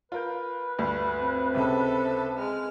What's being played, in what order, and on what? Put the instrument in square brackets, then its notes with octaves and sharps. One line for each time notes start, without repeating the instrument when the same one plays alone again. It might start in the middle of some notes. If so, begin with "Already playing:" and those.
[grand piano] F4 A#4 G6 [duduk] B4
[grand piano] D2 G2
[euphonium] C4
[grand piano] C#2 C3 [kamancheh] A4 E5
[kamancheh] G#3 F6